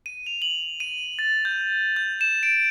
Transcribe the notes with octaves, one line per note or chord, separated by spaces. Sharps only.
D#7
F7
F#7
D#7
A6
G6
G6
E7
D7